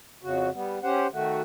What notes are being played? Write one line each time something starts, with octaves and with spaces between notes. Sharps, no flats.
F2 C#3 F#4
G3 B3
C#4 G4 C5 F#5
D#3 A3 F#4